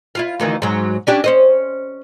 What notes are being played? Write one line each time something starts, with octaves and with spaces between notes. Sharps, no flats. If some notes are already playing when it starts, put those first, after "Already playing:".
E4 F4 F5
D2 D#3 E3
G#2 F#3
C#4 D4 G4
C#4 C5 D#5